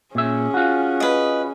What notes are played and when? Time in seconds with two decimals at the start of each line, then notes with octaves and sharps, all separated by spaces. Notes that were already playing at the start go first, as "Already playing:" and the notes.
0.15 A#2 C#4 G#4 E5
0.54 F4 F#4
1.00 B4 D#5